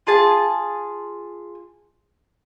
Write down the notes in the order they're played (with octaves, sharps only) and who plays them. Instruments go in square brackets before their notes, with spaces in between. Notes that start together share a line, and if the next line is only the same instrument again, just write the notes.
[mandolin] F4 G#4 A5